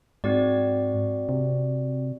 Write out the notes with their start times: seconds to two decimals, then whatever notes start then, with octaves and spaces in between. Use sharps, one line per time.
0.24 G#2 C4 F#4 D5
1.29 C3